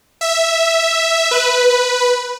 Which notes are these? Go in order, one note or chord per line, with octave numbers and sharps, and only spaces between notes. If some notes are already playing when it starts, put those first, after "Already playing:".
E5
B4